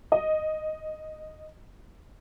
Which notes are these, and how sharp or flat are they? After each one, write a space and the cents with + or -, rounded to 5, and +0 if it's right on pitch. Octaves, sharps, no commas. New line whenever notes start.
D#5 -5